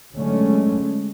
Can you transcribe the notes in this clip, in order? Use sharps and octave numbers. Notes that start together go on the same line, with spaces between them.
D3 F#3 G#3 A3 C#4